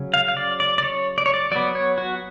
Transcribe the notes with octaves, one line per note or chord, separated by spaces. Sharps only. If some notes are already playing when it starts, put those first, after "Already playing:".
Already playing: C#3 F#3 C#4
F5
F5
D5
D5
D5
C#5
D5
C#5
D5
F#3 B3 D5
C#5
F#4